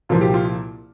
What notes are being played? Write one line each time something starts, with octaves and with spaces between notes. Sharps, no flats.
C2 A#2 F3 A#3 F4
G4
F4